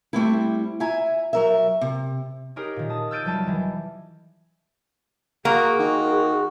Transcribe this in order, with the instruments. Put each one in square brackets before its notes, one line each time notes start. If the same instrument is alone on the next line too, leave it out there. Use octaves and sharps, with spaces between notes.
[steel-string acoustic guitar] G3 A3 C4 E4
E4 E5 G#5 A#5
F#3 A#4 E5
C3
[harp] D#4 G4 G#4 A#4 C#5
A#2 D#3
A5 D#6
E6 F6 G6 A6 D7 D#7
F1 F#3 G3 A5
D#3 E3
[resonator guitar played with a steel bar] A#3 [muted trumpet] F#4 [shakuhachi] G#4
[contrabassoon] D#3 [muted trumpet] F#4